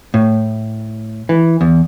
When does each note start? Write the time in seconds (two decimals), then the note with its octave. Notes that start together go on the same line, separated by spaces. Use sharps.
0.14 A2
1.29 E3
1.61 E2